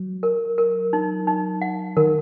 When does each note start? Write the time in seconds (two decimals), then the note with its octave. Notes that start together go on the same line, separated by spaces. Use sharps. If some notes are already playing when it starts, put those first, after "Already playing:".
Already playing: F#3
0.23 A#4
0.58 A#4
0.93 D#4
1.27 D#4
1.62 F#5
1.97 D#3 A#4